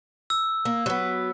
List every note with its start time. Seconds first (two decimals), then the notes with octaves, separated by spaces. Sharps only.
0.30 E6
0.65 A#3
0.86 F#3 B3